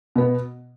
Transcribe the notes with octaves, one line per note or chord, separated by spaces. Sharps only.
B2 B3